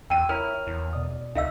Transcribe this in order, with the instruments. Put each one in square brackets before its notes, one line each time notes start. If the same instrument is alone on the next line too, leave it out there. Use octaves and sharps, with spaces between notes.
[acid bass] E2 [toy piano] G5 [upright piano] E6 D#7
[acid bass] E4 [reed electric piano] A#4 C#5 A#5 [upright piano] F6
[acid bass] E2 [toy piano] E4
[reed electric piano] B2 D5 D#6
[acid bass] C#2 [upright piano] D#4 [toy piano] E5 F5 E6